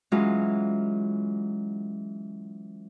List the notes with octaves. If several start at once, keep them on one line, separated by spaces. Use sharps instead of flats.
E3 F#3 G#3 C#4 F4